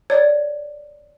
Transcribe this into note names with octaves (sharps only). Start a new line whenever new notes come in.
C#5 D5